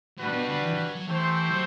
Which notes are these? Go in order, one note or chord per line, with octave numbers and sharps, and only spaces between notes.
A2 G3 D4 F#4 B4
C3
B2
D3
E3
E3
F#3
F#3
E3 A3 C4 G4 C5
F#3